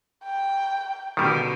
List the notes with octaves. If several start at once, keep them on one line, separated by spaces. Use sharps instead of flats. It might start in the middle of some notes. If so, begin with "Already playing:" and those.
G5
B2 D3 D#3 G3